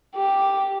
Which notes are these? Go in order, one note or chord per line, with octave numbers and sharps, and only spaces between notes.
G4